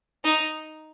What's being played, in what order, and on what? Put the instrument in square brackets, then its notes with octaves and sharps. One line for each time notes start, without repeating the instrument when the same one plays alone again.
[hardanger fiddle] D#4